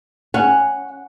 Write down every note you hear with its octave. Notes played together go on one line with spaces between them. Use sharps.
C#4 F#5